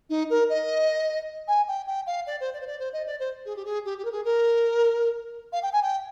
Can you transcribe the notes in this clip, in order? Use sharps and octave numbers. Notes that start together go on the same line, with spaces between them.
D#4
A#4
D#5
G#5
G5
G5
F5
D5
C5
D5
C5
D5
C5
D#5
D5
C5
G#4
G4
G#4
G4
G4
A#4
G#4
A#4
F5
G5
G#5
G5